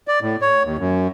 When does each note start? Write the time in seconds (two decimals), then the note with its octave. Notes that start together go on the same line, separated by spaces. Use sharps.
0.08 D5
0.21 A2
0.42 C#5
0.63 D#2
0.79 F#2